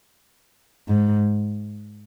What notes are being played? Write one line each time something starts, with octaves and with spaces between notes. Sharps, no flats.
G#2